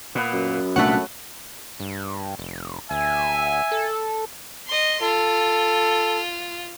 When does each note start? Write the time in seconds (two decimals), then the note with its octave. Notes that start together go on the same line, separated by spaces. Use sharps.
0.15 A#2 B3 B4
0.33 F#2
0.76 C2 A#2 A3 D4 B4 C#5 F#5
1.80 G2
2.39 F1
2.91 D2 E5 G#5
3.72 A4
4.67 D#5 C6
5.02 F4 A4